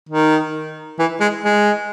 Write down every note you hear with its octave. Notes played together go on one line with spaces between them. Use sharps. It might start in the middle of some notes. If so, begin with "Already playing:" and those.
D#3
E3
G#3
G#3